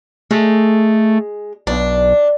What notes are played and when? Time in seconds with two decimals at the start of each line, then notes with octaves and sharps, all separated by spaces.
0.31 G#3 A3
1.67 B1 D4